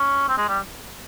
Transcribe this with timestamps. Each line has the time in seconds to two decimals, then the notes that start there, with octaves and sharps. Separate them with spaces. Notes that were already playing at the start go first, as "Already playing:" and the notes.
Already playing: C#4
0.28 C4
0.37 G#3
0.48 G3